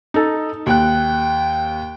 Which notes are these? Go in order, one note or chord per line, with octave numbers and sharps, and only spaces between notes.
D#4 A4
D#2 G5 F#6